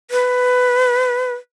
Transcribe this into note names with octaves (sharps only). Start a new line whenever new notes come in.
B4